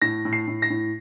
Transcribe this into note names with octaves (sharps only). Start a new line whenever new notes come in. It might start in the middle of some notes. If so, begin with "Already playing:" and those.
A2 A#6
A2
C7
A2
A#6
A2